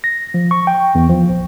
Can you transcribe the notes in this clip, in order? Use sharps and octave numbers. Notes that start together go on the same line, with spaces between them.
A#6
F3
C#6
G5
E2
F3
A#1